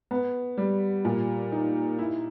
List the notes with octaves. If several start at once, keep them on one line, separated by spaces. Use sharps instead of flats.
B3
G3
A#2
D#4
E4